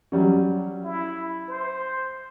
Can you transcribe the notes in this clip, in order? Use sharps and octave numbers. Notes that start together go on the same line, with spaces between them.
F#3 G3 C#4
E4
C5